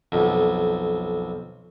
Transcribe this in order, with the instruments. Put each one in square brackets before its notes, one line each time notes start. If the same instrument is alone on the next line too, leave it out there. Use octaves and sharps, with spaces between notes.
[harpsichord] B1 F2